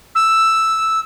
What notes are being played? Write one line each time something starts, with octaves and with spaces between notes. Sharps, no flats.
E6